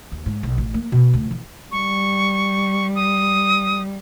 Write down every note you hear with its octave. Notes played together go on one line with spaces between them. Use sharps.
D#2
G#2
B1
A1
A#3
B2
D2
E3
G3 C#6
D#6